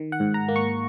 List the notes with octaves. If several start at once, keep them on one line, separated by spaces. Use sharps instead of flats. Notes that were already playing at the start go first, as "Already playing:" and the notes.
Already playing: D#3
F#5
G#2
A#5
A#3
C#6